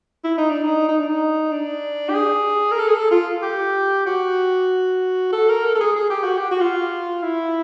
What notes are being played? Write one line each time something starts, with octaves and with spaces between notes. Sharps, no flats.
E4
D#4
D4
D#4
D#4
D4
D#4
D4
G4
G#4
A#4
A4
G#4
A4
F4
G4
F#4
A4
A#4
A4
A4
G#4
G#4
G4
F#4
G4
F#4
F4
E4